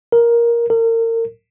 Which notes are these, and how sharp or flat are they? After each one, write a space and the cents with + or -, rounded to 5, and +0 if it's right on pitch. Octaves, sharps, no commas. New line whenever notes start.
A#4 +10
A#4 -35